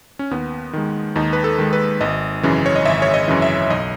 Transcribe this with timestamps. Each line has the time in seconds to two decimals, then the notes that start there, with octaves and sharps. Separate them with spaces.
0.19 C#4
0.31 D#2 B3
0.73 D#3 G#3
1.16 D#2 D#4
1.33 B4
1.44 A4
1.58 D#3 G#3
1.73 B4
2.01 G#1 D#5
2.43 F#2 C#3 E3
2.66 C#5
2.76 D#5
2.85 G#1 E5
3.02 C#5
3.14 D#5
3.28 F#2 C#3 E3
3.42 E5
3.70 B1 D#5